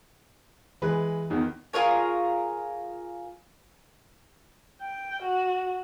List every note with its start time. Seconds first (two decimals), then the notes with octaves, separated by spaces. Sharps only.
0.82 E3 G#3 B4
1.30 E2 D#3
1.73 F4 G#4 A#4 C#5
4.81 G5
5.22 F#4